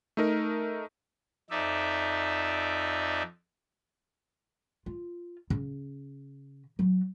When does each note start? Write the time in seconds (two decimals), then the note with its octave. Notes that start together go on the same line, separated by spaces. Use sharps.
0.17 A3 D#4 A#4
1.50 F2 D#4 D5 E5
4.86 F4
5.50 C#3
6.79 F#3